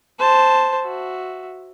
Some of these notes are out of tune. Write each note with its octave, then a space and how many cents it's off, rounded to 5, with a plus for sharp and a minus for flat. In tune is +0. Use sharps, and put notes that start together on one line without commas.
C5 +0 A5 +0
F#4 +0 E5 +0